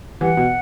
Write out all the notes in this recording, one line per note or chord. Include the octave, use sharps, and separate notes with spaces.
E3 G3 F#5
B2